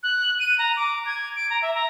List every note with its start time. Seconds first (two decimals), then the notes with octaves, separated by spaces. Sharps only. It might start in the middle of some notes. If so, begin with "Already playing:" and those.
0.03 F#6
0.40 D#7
0.58 A#5
0.77 D6
1.06 G#6
1.36 D7
1.50 A#5
1.62 E5
1.74 A#5